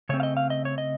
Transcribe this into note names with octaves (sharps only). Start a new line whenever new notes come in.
C#3 A3 C4 C#5
F5
D#5
F5
D#5
C#5
D#5